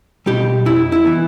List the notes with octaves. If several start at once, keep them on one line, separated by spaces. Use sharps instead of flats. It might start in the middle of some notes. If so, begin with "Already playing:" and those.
B2 G3 G4
F2 E4
E4
E3 B3